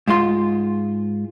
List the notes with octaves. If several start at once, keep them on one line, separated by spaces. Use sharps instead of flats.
G#2 G#3 F4 C6